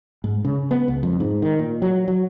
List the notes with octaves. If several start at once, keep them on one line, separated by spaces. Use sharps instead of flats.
G#2
C#3
B3
C#2
F2
G#2
D#3
A#2
F#3
F#3